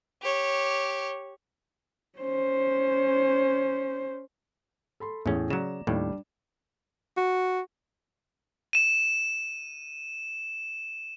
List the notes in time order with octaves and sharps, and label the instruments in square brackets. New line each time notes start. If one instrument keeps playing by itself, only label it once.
[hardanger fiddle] G4 C#5
[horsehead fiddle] C#4 C5
[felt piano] A4 B5 C6
[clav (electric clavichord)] E2 C#4 [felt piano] A2 G#4
[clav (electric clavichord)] C#3 F#3 [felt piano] D5 A#5 E7
[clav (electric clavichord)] D#2 A2 [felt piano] G3 D4
[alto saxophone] F#4
[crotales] D#7 E7